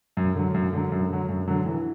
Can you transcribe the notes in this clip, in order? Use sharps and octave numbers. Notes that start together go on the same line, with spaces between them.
F#2
D3 F#3
F#2
D3 F#3
F#2
D3 F#3
F#2
D3 F#3
E3